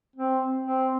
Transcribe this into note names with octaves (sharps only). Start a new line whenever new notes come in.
C4
C4